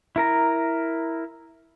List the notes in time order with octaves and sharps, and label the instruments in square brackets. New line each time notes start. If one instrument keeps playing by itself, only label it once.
[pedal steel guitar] E4 A#4 A#5